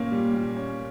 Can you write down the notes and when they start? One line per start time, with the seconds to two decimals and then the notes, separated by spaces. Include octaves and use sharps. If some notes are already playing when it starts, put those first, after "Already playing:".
Already playing: A#2 A#3 C#4
0.11 G3
0.34 A#2
0.57 C#4